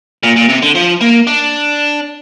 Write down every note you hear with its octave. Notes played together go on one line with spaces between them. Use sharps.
A#2
A#2
C3
D3
F3
A#3
D4